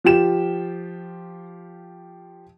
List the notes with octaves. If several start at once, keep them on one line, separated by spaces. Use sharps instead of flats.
F3 F4 G4 E7